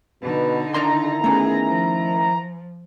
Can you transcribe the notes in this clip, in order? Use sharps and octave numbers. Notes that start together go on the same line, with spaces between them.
B2 D3 D#4 B4
D#3 D4 E4 A#4 A#5 C6
A3 B3 C#4 G#4
F3